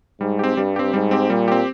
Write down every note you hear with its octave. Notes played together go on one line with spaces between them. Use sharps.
G#2 G3
C4 G4
G2 G3
C4 G4
G#2 G3
C4 G4
A#2 G3
C4 G4